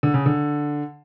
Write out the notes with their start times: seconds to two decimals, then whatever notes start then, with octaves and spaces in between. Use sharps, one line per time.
0.03 D3
0.14 C#3
0.26 D3